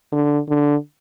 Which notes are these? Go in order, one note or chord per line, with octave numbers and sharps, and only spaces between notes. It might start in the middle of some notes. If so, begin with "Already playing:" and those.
D3
D3